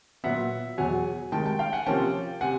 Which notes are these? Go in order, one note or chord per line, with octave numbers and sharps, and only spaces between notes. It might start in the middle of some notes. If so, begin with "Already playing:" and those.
A#2 F#3 B3 E5 F#5
E2 B2 F#3 F#5 G#5
C3 D#3 G#3 G5 A5
G5 A5
F5 G5
F#5 G#5
C3 F3 A#3 C#4 G5 A5
C3 F#5 G#5